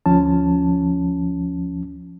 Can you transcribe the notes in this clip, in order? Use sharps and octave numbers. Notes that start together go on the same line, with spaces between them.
D2 F3 C#4 A5